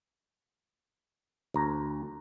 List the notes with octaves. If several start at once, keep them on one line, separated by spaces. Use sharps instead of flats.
D2 A#5